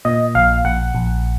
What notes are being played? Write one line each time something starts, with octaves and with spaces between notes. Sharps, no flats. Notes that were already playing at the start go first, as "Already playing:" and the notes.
A#2 D#5
A#1 F5
A#1 F#5
A#1